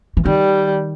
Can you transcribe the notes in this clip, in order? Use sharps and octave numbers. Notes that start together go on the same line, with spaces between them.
E3
D#3 G3